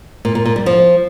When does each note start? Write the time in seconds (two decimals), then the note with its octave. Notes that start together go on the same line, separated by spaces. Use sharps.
0.25 A#2
0.35 A#2
0.46 A#2
0.56 G3
0.66 F3